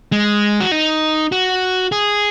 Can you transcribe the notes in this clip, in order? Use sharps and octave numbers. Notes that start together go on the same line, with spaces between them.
G#3
F#4
D#4
F#4
G#4